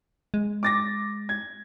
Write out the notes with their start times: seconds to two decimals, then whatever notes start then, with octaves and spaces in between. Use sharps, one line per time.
0.34 G#3
0.63 D6 A6 A#6
1.29 G#6